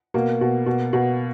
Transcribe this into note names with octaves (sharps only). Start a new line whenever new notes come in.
B2 A#3
B2
B2
B2